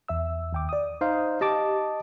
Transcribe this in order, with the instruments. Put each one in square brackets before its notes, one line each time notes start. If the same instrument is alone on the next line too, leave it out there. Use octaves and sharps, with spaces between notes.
[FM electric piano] E2 E5 E6
D#2 G5 D6
D5 D#6
[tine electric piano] D#4 C5 F5
[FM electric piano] G4 [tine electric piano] D#5 A5 D6